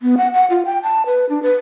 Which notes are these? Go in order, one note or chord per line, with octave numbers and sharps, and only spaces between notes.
B3
F#5
F#5
F4
G5
A5
B4
D4
B4